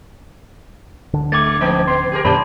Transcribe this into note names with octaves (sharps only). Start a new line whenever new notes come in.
D1 D3 D4
G#3 D6 G#6 A6
F3 A3 B3 D#4
B3 C6
G4 G#4 A#4
F#2 B2 D#3 A3 C#4 G4 A5 B5